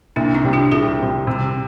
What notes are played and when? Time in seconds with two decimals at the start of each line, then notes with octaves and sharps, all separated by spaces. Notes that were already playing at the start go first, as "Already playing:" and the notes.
0.16 C2 A#3 D4
0.34 C4 D#4
0.43 C3 G3
0.53 D4 F4
0.72 C2 F4 G#4
0.99 C3 G3
1.27 C3